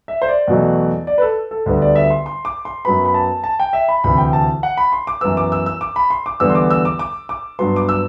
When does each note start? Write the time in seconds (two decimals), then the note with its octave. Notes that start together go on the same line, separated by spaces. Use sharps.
0.08 E5
0.22 C5
0.28 D5
0.48 E2 B2 F#3 A3
1.07 D5
1.18 B4
1.22 A4
1.51 A4
1.66 D2 D3 G3 B3
1.82 D5
1.95 E5
2.10 C6
2.26 C6
2.45 D6
2.65 C6
2.85 F#2 F#3 B3 B5
3.05 B5
3.14 A5
3.44 A5
3.60 G5
3.73 E5
3.89 B5
4.04 D2 C3 E3 B5
4.18 G5
4.33 A5
4.63 F#5
4.77 B5
4.92 C6
5.07 D6
5.21 F#2 E3 B3 E6
5.37 D6
5.52 E6
5.66 E6
5.81 D6
5.96 B5
6.10 C6
6.26 D6
6.40 E2 D3 G3 B3 E6
6.50 C6
6.55 D6
6.70 E6
6.85 D6
6.99 D6
7.29 D6
7.59 G2 F#3 B3 C6
7.76 D6
7.89 E6